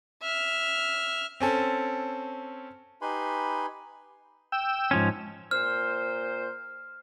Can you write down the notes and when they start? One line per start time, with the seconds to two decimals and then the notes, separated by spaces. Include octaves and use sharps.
0.22 E5 F6
1.40 C4 C#4 A4
3.02 D#4 G4 B4 G#5 B5 C6
4.52 G5 E6
4.91 G#2 F3 C#4
5.51 A#2 C5 F6